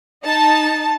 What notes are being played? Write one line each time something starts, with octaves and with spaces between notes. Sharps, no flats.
D#4 A5